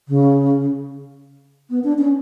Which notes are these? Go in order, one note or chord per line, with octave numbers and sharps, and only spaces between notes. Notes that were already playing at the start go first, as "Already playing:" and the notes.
C#3
B3
D4
C#4